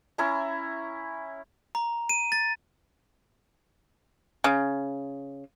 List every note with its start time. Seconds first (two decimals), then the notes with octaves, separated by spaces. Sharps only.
0.18 C#4 E4 A#5
1.75 A#5
2.09 D#7
2.32 A6
4.44 C#3